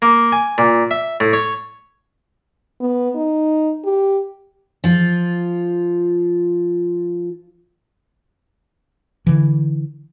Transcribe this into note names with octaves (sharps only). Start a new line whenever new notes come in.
A#3
G#5
A#2
E5
A2
C#5
B3
D#4
G4
F3 F4
D3 E3